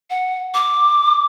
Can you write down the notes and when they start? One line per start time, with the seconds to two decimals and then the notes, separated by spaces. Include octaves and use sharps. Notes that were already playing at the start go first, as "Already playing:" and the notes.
0.10 F#5
0.54 D6